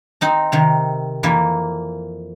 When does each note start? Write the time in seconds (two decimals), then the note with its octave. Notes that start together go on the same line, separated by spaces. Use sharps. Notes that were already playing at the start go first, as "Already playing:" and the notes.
0.21 C4 D#4 A#5
0.52 C3 D#3 A#5
1.23 F2 E3 A#3